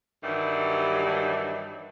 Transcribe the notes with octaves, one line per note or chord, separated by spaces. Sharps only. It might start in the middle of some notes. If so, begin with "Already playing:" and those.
G2 D#3 E3 F#3 G3